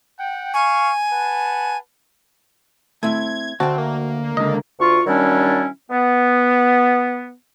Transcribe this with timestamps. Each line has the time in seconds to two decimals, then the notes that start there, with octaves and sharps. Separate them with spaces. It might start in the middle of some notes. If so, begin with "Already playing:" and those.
0.18 F#5 G5
0.54 F5 G#5 C#6
1.11 B4 F#5 A5
3.03 A3 C4 E4 G#6
3.60 D2 C4 F#4 G5 A5
3.78 A#3
4.37 C#2 D3 D#5
4.80 D2 F4 C#6
5.06 D#3 F#3 G3 C#4 D4 E4
5.91 B3